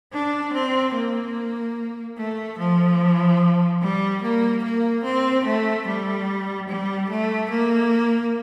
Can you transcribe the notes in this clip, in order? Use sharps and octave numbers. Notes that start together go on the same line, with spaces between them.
D4
C4
A#3
A3
F3
G3
A#3
A#3
C4
A3
G3
G3
A3
A#3